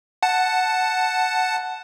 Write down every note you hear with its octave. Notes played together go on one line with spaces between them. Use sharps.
F#5 A5